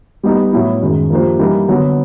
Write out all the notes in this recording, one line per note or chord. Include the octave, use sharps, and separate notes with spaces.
G3 B3 D#4
A2 F#3 B3 E4
F#2 D#3 G#3
F3 A#3 D4 G4 C5
E3 G3 A#3 D#4
D3 F#3 B3